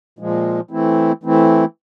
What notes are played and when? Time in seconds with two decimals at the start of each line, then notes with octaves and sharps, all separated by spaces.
0.19 A#2 F3 G#3
0.71 E3 A3 C4 E4
1.23 E3 A3 C4 E4